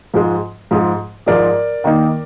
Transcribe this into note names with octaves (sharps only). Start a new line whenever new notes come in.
G#2 F3 G#3
G#2 F3 G#3
G#2 F3 G#3 A#4 D5
D#3 A#3 D#4